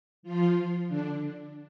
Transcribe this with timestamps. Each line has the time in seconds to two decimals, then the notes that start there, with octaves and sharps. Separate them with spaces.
0.23 F3 F4
0.89 D3 D4